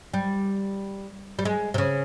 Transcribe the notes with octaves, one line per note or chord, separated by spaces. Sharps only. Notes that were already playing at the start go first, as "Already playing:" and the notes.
G3
G3
G#3
C3
C#3